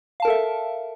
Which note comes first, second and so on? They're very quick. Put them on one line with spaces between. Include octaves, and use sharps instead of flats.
F5 A5 A#4 A4 E5